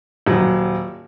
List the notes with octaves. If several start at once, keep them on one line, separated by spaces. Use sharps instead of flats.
D#1 F#3